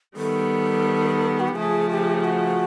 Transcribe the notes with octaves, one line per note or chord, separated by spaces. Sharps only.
D#3 G3 B3 A4
F#4
G4
C#3 F3 A3 G#4
G4
F#4